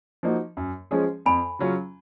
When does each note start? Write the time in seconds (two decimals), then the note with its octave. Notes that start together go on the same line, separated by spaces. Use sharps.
0.23 F3 A#3 D#4 F#4
0.57 F#2
0.91 F3 G#3 C#4 G#4
1.26 F2 G#5 B5
1.59 C#3 F#3 C#4 F4